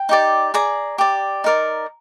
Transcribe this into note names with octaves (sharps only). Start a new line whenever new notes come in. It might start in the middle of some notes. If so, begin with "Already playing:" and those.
Already playing: G5
D#4 G4 D5
G#4 D5 A#5
G4 D5
D#4 A#4 D5